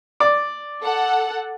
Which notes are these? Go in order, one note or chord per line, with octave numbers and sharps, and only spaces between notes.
D5
A4 F#5